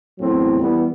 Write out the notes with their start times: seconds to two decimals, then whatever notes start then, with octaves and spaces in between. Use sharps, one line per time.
0.19 E2 A2 F#3 C4
0.61 E3 G3 B3